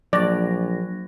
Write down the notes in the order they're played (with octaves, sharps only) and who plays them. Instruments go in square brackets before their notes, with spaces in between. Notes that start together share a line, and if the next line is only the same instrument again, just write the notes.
[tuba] A#1 [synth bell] F#3 A#6 [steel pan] D5